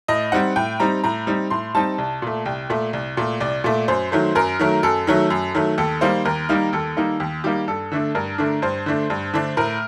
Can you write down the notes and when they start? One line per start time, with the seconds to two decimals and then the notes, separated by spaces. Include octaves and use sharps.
0.08 A2 D#5
0.32 G3 C4 D#4 F#5
0.56 A2 G5
0.80 G3 C4 D#4 A#5
1.04 A2 A#5
1.27 G3 C4 D#4
1.50 A2 C6
1.75 G3 C4 D#4 A5
1.98 C2
2.22 A#2 A3
2.46 C2 G5
2.70 A#2 A3
2.93 C2
3.17 A#2 A3
3.40 C2 D5
3.64 A#2 A3
3.88 F#2 C5
4.12 D#3 F#3 A3
4.35 F#2 A#4
4.59 D#3 F#3 A3
4.83 F#2 A4
5.07 D#3 F#3 A3
5.30 F#2
5.55 D#3 F#3 A3
5.78 D#2 A4
6.01 D#3 G3 A#3 D#4 C5
6.25 D#2 A#4
6.49 D#3 G3 A#3 D#4
6.73 D#2 A4
6.96 D#3 G3 A#3 D#4
7.20 D#2
7.44 D#3 G3 A#3 D#4 G4
7.68 G2 A4
7.92 D3 A3 D4
8.15 G2 A#4
8.38 D3 A3 D4
8.62 G2 C5
8.86 D3 A3 D4
9.10 G2
9.34 D3 A3 D4
9.57 A2 A#4